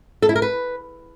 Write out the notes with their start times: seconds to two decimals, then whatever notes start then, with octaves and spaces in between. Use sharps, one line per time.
0.22 A4
0.29 E4
0.36 A#4
0.42 B4